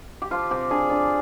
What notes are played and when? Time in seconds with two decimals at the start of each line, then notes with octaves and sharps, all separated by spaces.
0.22 G4
0.31 F3 F4
0.51 C3 G4
0.71 D4 G#4
0.90 D4 D5